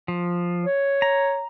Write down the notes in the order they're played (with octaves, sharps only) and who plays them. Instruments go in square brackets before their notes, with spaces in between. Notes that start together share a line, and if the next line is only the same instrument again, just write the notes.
[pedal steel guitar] F3
[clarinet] C#5
[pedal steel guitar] A#5